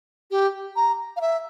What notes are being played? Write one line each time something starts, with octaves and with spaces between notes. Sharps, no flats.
G4
A#5
F5
E5